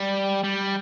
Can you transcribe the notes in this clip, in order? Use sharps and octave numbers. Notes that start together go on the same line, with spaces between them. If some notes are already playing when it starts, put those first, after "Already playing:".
Already playing: G3
G3